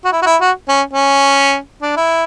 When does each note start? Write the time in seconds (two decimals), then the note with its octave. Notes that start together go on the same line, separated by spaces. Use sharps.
0.05 F#4
0.12 E4
0.22 F#4
0.26 E4
0.41 F#4
0.69 C#4
0.93 C#4
1.82 D4
1.97 E4